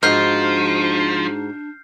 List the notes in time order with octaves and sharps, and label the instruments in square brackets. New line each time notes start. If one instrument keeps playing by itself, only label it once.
[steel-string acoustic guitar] G#2 F#4 [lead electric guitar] F3 [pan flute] D4 [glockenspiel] F6 G6 C7